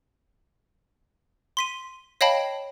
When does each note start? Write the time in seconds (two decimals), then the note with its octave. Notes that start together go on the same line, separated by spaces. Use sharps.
1.57 C6 B6 D#7
2.21 C#5 D#5 F5 G5 A5 B5